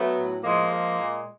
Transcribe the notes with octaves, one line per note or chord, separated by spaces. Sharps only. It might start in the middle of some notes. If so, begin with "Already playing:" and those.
Already playing: F#3 A3 B3
A2
F3 G#3 A#3
G#3
A#2